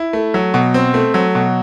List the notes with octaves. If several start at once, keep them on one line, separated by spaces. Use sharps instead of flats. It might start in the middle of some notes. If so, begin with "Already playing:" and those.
Already playing: E4
A3
F#3
B2
C4
A3
F#3
B2